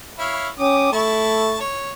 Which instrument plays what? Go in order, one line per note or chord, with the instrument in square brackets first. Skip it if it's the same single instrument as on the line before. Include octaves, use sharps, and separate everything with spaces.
[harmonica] E4 C#5 F5
[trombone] C#4 [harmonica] G4 D6 D#6
[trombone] A3 [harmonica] E4 A5 C#6
[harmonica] C#5